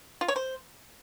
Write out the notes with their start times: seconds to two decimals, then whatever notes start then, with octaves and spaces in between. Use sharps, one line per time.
0.21 F4
0.28 C#5
0.36 C5